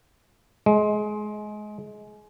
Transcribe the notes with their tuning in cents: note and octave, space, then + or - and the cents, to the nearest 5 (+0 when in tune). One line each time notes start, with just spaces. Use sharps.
G#3 +25